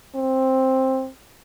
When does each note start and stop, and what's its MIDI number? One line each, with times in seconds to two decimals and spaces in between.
0.15 1.08 60